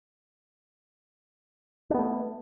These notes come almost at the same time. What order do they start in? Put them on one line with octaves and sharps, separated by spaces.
D4 B3 A3